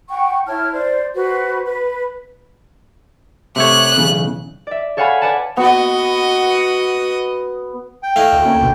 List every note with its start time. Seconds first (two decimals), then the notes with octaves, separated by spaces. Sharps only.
0.09 F#5 G5 C#6
0.47 E4 C#5 A5 F6
0.72 C5 D5
1.15 F#4 B4 C5
1.65 B4
3.56 C3 A3 C#5 F#6
3.98 B1 E2 C#3
4.67 D5 E5
4.97 A4 C#5 F5 F#5 G#5 B5
5.21 B4 D5 F#5 G#5 A5 B5
5.57 B3 F#4 D#5
8.03 G5
8.16 A3 E4 D#5 F5
8.33 D2
8.45 A#3 C#4
8.61 A1 B2 D3